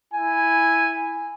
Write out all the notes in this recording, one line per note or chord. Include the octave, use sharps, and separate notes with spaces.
E4 G#5